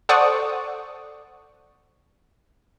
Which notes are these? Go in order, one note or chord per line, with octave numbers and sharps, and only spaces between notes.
A4 C5 D5 F#5 C#6 D#6